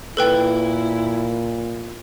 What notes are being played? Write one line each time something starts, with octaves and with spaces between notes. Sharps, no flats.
A#2 E4 A4 B4 G5